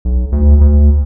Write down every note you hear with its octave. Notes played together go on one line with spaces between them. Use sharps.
B1
D2
D2